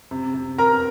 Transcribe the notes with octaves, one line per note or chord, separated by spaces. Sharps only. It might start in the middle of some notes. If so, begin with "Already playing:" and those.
C3
C3
C4 A#4 A#5